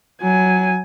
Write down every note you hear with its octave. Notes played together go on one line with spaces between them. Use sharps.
F#3 G#5